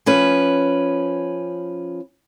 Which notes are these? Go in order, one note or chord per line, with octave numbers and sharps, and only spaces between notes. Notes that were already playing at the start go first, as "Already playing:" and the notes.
F3 C#4 B4